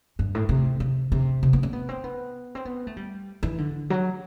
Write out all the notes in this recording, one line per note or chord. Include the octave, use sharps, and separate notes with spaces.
G2
A2
C3
C3
C3
C3
B3
C4
B3
C4
B3
C4
B3
A3
G3
E3
D3
F#3